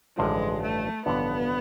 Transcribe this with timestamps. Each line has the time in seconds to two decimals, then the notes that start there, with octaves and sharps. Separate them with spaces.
0.17 A1 G2 D3 F3 G#3
0.62 A3
1.06 A1 G2 D3 F3 B3